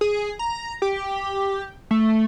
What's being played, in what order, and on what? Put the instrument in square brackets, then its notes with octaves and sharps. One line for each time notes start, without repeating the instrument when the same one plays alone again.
[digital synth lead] G#4
A#5
G4
A3